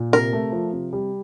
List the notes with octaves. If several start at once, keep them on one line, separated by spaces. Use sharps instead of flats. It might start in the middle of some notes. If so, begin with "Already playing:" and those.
Already playing: A#2
C3 A#4
A3
F3
C3
G3